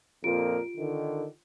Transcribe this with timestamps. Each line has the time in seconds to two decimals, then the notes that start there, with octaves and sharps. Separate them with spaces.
0.24 F2 A#2 F4 G4 A#4 D7
0.77 D3 D#3